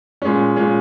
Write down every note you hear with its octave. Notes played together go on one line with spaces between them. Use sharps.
A#2 G#3 C#4
A#2 G#3 C#4